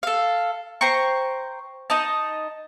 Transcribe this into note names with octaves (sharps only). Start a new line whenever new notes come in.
A4 F5
C5 G5 A#5 C#6
D#4 D#5 A5